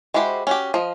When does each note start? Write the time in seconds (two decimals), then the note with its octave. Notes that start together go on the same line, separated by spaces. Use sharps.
0.14 G#3 E4 F#4 G4 C5
0.47 C#4 F#4 G4
0.74 F3 D#5